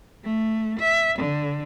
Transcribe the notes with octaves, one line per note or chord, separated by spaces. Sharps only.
A3
E5
D3